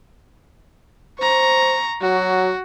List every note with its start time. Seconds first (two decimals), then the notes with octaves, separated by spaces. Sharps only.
1.19 C5 A#5 C#6
2.01 F#3 F#4